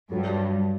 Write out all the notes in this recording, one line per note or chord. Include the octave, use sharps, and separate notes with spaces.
G2 F#3